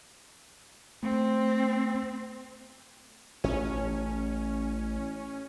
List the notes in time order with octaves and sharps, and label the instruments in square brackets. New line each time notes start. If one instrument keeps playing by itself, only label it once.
[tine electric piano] A3 [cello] C4
[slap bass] A1 [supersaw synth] C#4